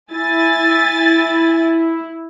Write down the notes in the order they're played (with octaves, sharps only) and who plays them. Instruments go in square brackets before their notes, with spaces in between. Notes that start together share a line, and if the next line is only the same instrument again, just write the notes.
[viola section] E4 [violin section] G#5 A6